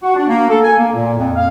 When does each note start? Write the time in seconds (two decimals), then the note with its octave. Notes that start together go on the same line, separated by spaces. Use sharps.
0.03 F#4
0.16 D4
0.28 A#3
0.50 A4
0.64 G#5
0.77 A#3
0.93 A#2
1.17 F2
1.36 F5